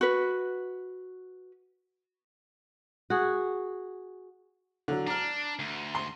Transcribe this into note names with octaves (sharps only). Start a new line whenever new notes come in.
F#4 B4
F#4 G#4
D3 F#3
D4 A#5 F6
D2
C6